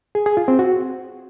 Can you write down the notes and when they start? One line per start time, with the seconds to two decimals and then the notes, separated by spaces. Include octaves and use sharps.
0.15 G#4
0.26 G#4
0.37 F4
0.48 C4
0.59 F#4